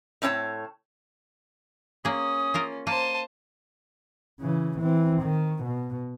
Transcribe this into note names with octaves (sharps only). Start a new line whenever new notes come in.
A2 C4 D4 C#5 A5
A#3 C#4 G#4 D#6
A#3 F4 A#4
A#3 C5 A5 D#7
C#3 E3
E3 C4
D#3
B2